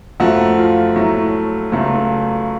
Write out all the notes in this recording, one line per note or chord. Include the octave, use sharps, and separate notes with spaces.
F#2 F3 A3 F#4
F4
A2 F#3 A3
C#2 C#3 F#3 A3